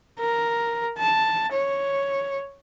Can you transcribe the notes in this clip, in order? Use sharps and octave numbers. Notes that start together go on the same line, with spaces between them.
A#4
A5
C#5